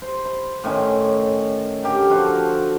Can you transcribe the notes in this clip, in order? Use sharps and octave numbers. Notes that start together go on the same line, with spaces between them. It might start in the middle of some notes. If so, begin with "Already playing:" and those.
C5
B5
A2 D#3 C#4 C6
D3 G4 A#4 G5
F3 F4 F#4 A#4
A4